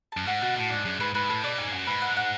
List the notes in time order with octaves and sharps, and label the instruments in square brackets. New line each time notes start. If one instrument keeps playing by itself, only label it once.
[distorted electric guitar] F#2 [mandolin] A5
[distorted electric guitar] G#2 [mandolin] F#5
[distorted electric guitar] B2 [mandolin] F#4
[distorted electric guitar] A2 [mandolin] A5
[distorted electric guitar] G#2 [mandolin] D4
[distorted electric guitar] F#2 [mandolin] G#4
[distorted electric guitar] G#2 [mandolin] B4
[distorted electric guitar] G#2 [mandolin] B4
[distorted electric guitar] A2 [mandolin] A4
[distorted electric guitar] B2 [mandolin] D5
[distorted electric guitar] G#2 [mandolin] G#5
[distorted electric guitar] F#2 [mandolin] G#5
[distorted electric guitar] G#2 [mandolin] B4
[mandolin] F#5
F#5